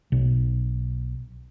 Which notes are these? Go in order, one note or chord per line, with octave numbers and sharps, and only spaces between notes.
B1